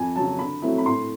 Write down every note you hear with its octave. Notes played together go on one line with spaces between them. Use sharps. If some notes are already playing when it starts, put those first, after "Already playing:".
Already playing: F2 G#5
C#3 F#3 A5
D3 B5
F#3 A3 C4 E4
B5
A2 C6